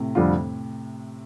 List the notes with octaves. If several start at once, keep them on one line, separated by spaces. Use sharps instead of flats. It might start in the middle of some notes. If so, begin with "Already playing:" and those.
Already playing: A2 C3
F2 D3 G3 D4 F4